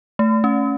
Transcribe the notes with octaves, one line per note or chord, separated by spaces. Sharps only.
A3
C#4